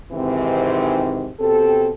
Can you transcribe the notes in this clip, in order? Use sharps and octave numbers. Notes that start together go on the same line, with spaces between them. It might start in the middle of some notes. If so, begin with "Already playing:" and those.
G#2 C3 D#3 E3 C4
B2 C4 G4 A4